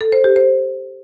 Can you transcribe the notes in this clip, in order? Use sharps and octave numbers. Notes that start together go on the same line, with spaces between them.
A4
C5
G4
C5